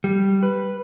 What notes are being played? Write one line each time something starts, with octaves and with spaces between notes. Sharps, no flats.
G3
B4